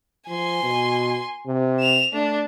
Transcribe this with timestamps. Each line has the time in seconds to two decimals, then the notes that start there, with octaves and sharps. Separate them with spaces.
0.28 F3 G#5 C6
0.63 B2
1.47 C3
1.80 E7 F7
2.13 A3 D4